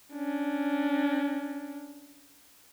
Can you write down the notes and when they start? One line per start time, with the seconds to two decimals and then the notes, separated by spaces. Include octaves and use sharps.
0.14 C#4 D4